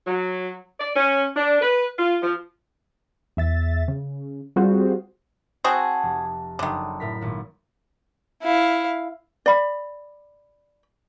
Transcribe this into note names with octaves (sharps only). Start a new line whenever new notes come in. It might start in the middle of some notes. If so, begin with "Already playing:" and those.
F#3
D5
C#4
D4
B4
F4
F3
E2 E5 A6
C#3
G3 C4 F4 F#4 G#4 C5
C4 F#4 G#4 F#5 A5
F1
F#1 D3 D#3 D#6
A2 A#4 B6
G#1 A#2
E4 F5
D5 B5